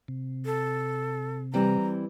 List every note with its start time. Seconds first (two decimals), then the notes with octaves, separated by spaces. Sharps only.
0.08 C3
0.45 A4
1.54 E3 G3 C4 A#5